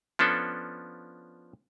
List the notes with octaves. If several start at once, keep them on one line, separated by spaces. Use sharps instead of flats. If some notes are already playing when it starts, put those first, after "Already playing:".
F3 B3 C#4 D4 A4